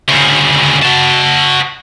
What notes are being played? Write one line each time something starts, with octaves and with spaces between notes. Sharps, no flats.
D2 C#3
F#4 A5